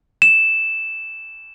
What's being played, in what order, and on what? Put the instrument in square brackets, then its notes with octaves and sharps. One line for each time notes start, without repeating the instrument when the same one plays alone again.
[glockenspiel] E7